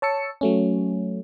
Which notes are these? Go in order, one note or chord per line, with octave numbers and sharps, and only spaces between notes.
C#5 A5 E6 C#7
F#3 A3 C#4